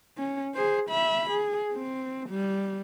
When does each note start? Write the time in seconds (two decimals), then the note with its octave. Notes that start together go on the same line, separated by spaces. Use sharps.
0.17 C#4
0.55 G#4 C5
0.90 E5 B5
1.30 G#4
1.74 C4
2.29 G3